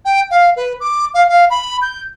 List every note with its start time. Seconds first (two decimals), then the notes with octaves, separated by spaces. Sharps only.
0.05 G5
0.31 F5
0.56 B4
0.80 D6
1.14 F5
1.29 F5
1.50 B5
1.82 G6